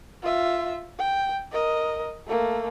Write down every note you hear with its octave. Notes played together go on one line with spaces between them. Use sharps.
F4 E5
G5
A#4 D#5
A3 A#3